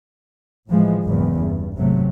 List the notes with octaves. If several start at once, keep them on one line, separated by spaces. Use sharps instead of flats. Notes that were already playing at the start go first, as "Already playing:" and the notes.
A2 E3 F3 G#3
F#1 E2 G#2
G2
G#1 C3 F#3 A3